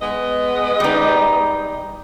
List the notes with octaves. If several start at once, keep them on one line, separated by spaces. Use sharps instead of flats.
G#3 B3 D#5
G3 D#4